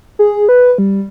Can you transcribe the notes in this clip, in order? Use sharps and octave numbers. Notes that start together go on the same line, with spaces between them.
G#4
B4
G3